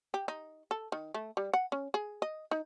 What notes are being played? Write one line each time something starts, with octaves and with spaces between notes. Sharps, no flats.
G4
D#4
A4
D#3
A3
G3
F#5
C#4
G#4
D#5
D#4